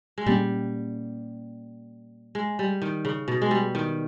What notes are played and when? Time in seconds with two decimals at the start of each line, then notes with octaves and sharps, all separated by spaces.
0.18 G#3
0.26 A#2 G3 A#3 C#4
2.35 G#3
2.59 G3
2.82 D#3
3.05 C#3
3.28 B2
3.42 G#3
3.51 G3
3.75 D#3